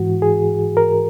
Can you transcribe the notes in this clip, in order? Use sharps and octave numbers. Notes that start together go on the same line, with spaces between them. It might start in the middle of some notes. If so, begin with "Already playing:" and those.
Already playing: G#2 E3 F#4
G#4
A#4